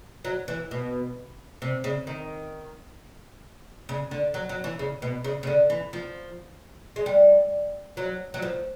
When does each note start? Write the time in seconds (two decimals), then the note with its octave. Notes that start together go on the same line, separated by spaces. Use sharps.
0.25 F#3
0.48 E3
0.71 B2
1.62 C3
1.84 C#3
2.07 D#3
3.89 C#3
4.11 D3
4.34 F#3
4.49 F#3
4.64 E3
4.79 C#3
5.02 B2
5.24 C#3
5.43 C#3
5.47 D3
5.70 E3
5.93 F3
6.96 G#3
7.06 G3
7.97 F#3
8.34 F#3
8.42 F3